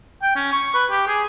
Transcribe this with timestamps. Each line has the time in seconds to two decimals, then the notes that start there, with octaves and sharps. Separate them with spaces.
0.22 G5
0.35 C#4
0.52 C#6
0.74 B4
0.90 G4
1.07 G#4